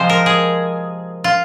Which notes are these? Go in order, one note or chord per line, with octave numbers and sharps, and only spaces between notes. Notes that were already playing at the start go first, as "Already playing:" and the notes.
Already playing: C3 F3 G#3 C5 D#5
A#4
G#4
F4